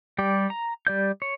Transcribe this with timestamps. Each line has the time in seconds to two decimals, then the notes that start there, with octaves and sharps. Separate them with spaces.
0.18 G3 G4 D5
0.50 A#5
0.87 G3 D5 G6
1.22 C#5